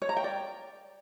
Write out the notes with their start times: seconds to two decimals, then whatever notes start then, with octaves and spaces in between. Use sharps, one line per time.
0.02 C#5
0.09 A#5
0.17 G5
0.24 D5